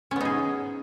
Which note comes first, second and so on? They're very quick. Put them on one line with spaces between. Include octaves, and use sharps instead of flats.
C#4 B3 D#4 G#4